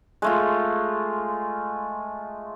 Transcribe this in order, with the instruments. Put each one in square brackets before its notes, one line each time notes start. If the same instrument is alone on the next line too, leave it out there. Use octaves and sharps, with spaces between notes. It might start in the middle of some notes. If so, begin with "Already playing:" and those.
[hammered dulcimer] G#3 A3 F4